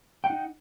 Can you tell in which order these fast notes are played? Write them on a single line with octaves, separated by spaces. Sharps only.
G5 F#5 D#4